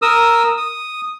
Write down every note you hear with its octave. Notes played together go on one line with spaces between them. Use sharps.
A#4 D#6 E6
D#6